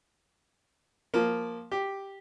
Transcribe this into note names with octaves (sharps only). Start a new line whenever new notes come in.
F3 A#3
G4